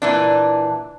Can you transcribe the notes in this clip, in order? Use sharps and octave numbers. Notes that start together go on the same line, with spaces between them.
A#2 E3 D4